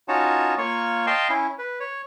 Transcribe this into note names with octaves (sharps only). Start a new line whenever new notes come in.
C#4 D#4 F4 F#4 C#5 A5
A#3 F4 C#5 C#6
D#5 F5 G5 A5 C6
C#4 E4
B4
C#5